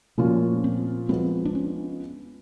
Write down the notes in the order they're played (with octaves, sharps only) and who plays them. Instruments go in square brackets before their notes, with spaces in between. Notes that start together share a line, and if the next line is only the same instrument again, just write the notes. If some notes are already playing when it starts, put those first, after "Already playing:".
[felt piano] A#2 F3 A#3 C#4 F4 [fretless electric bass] A3
[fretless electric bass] C4
[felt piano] F3 G#3 B3 [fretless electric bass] C4
[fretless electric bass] D4
C#4